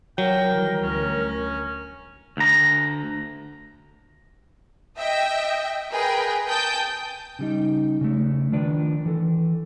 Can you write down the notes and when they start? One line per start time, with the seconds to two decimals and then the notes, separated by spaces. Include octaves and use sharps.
0.18 F#3 A#4 G5
0.50 D#3 E3 G3
0.83 D2 C#4
2.37 D2 A#5
4.98 D#5 E5 G5
5.92 G#4 A#4 B4 G5
6.49 G5 A5 D#6 G6
7.39 C#3 G3 D#4
8.01 C#3 A3
8.52 D#3 F3 D4 B4
9.06 E3 A4